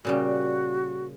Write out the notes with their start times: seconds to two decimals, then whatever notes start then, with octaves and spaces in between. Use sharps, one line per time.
0.05 A#2 C#3 G3 F#4